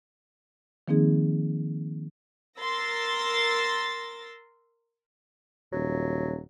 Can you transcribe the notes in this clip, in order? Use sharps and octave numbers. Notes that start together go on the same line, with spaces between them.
D#3 F3 A#3 C4 D#4 G#4
A#4 C6 E6 A6 A#6
D#1 F#3